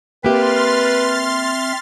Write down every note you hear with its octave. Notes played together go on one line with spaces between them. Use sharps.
A#3 C4 G4 B4 E5 C6 F6 A6